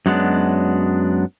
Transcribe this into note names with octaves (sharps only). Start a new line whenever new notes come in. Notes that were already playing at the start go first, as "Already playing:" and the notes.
F#2 F#3 G#3 B3 D4